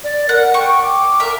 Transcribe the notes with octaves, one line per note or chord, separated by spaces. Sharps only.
D5
A#4 F#5
G5 C#6
D6
A#4 E5